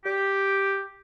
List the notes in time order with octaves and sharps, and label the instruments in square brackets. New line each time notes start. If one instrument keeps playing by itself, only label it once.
[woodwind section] G4